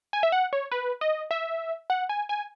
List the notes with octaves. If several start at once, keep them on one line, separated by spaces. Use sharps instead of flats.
G#5
E5
F#5
C#5
B4
D#5
E5
F#5
G#5
G#5